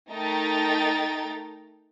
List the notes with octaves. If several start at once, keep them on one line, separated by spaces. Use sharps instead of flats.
A3 D#4 A#4 G5 A#5 A6